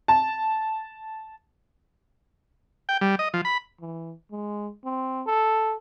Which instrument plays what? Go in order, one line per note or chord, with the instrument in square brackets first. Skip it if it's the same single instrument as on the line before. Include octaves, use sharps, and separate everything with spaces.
[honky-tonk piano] A5
[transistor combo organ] G5
G3
D#5
F3
B5
[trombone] E3
G#3
C4
A4